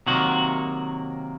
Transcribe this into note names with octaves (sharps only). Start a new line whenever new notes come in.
C3 D#3 F#3 A#3 F#4